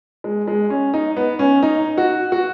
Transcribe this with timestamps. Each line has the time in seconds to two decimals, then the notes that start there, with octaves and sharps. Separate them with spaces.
0.24 G#3
0.48 G#3
0.70 C#4
0.94 D#4
1.17 B3
1.39 C#4
1.63 D#4
1.98 F#4
2.32 F#4